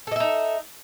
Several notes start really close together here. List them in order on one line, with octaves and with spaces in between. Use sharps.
A4 D#5 E5 D#4